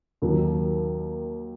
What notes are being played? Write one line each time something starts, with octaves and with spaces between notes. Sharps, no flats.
D#2 D#3 F#3